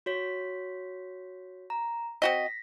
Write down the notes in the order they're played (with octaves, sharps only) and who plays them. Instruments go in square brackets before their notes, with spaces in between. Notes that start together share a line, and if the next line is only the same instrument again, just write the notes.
[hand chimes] F#4 C#5 B6
A#5
[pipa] C4 F#4 D#5 [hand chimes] A#6 B6